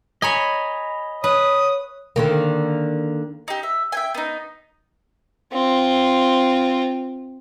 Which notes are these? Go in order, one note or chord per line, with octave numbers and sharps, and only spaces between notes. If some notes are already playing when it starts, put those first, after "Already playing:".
C#5 D#5 G#5 A#5 B5
B4 C#5 D#6
D3 D#3 A#3
D#4 G4
E5
E5 G5 G#5
B3 D#4
C4 F4